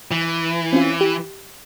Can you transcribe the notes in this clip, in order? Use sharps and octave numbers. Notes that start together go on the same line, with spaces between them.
E3
C4 C#4 F4
G4